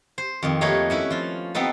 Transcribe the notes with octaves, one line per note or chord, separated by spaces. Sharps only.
C5
F2 D#3
A3 A#3 D#4 G4 B4 C#5
C#4 E4 B4
F3 F4
B3 C4 D#4 A4 B4